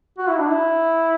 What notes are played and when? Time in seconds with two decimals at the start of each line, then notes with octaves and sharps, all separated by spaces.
0.18 F#4
0.28 E4
0.39 D4
0.49 E4